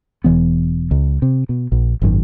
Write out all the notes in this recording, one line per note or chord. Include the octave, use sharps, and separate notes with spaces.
E1 D#2 E3 B3
C#2
C3
B2
A#1
G#1 F#2 D#3